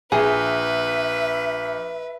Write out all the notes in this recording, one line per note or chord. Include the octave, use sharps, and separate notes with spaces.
A#1 G#4 B4 E5